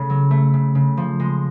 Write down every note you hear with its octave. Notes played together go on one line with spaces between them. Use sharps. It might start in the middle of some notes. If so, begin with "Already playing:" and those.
Already playing: C#3 A3
F#3
A3
C#3
C#3
F3
G#3